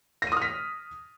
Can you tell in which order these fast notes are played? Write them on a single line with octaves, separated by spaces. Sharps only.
A#6 D#7 D#6 F6 B6